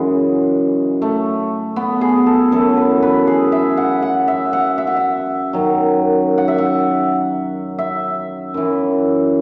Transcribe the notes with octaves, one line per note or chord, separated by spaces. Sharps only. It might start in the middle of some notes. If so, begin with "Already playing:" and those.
Already playing: F#2 C#3 E3 G#3
A3
B3
G#4
A4
F#2 E3 A4
B4
B4
G#4
E5
F#5
F#5
E5
F#5
E5
F#5
E5
F#2 D#3 F#3
F#5
E5
F#5
E5
F#2 E3